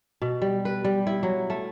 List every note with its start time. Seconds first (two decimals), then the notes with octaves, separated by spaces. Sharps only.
0.22 B2
0.42 G3
0.65 B4
0.84 G3
1.07 E4
1.23 F#3
1.50 A3